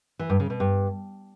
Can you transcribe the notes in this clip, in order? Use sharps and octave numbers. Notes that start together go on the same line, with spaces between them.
E3
G2
C#3
B2
G2